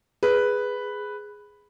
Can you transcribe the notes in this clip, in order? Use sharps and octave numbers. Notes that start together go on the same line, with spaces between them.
G#4 B4